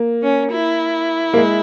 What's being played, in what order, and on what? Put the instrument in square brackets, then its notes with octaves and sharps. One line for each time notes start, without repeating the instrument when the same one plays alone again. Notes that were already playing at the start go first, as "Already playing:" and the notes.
Already playing: [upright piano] A#3
[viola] C#4
E4
[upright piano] A#3
G#3